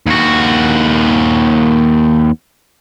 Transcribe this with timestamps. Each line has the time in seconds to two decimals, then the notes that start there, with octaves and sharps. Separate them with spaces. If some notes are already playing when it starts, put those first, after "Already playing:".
0.06 D#2 F#4